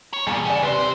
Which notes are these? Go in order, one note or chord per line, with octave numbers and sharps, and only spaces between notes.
C#5
E2 G2 A#2 G#4 A5
C#3 D5 F#5 G#5
D#2 C3 B4 C5 D5
C3